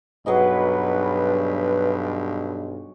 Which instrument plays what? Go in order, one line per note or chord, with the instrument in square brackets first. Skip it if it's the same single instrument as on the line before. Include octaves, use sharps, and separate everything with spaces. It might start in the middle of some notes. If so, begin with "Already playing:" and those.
[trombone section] B1 G2 [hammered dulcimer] F#3 G#4 D#5 [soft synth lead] B4